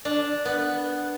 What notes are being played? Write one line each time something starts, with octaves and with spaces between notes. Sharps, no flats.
D4
B3